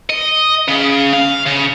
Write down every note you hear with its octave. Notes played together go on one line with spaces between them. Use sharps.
D#5
C#3
F5
C#3